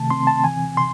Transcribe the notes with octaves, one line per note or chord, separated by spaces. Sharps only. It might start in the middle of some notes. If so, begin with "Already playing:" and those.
Already playing: C3 D#3 A3 A5
C4 C6
A5
E3 G#5
C3 C6